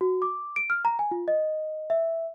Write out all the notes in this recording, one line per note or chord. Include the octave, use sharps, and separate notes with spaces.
F#4
D6
D7
F6
A#5
G#5
F4
D#5
E5